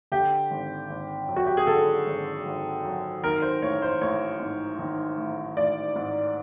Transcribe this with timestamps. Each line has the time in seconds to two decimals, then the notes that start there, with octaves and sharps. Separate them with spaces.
0.12 D3 G4
0.51 G#1
0.90 G#1
1.28 F#2
1.36 F#4
1.46 G4
1.57 G#4
1.67 D3 A4
2.06 G#1
2.46 G#1
2.84 F#2
3.23 D#3 A#4
3.42 C5
3.62 A1 C#5
3.82 C5
4.01 A1 C#5
4.40 G#2
4.79 D#3
5.18 A1
5.57 A1 D5
5.96 G#2